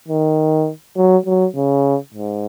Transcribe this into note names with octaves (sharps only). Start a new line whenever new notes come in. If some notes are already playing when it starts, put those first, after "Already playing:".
D#3
F#3
F#3
C#3
G#2